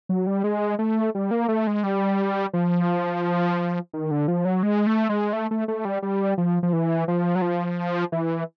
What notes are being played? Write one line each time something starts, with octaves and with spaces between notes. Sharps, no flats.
F#3
G3
G#3
A3
G3
A#3
A3
G#3
G3
F3
D#3
D3
F3
F#3
G#3
A3
G#3
A3
A3
A3
G3
G3
F3
F3
E3
F3
F#3
F3
E3